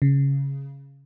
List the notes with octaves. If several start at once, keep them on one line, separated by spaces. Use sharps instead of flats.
C#3